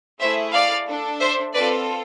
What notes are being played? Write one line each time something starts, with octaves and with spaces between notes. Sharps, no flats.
A3 E4 G#4 C5 E5
D5 F5
D4 A4
C5 E5
C4 F4 A4 B4 D5